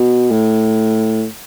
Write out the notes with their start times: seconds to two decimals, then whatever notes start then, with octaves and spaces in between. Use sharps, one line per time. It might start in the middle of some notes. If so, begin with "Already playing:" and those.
Already playing: B2
0.31 A2